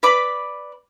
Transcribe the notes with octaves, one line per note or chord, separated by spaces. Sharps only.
B4 D5 B5 D6